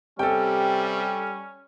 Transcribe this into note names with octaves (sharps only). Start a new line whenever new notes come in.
C3 G3 C#4 A4 G5